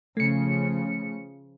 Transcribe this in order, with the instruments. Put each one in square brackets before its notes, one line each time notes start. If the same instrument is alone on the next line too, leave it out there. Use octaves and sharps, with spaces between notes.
[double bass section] C#3 F3 [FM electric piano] A3 C#7